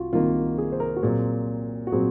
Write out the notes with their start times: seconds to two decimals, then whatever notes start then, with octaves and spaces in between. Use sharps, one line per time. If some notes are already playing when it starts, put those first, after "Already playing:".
Already playing: C2 F4 F#4
0.13 C2 C3 D#3 A#3 F4
0.58 G#4
0.72 C5
0.80 A#4
0.96 F#4
1.03 A#2 F#3 C4 G#4
1.87 F#4
1.92 A#2 F#3 C4 G#4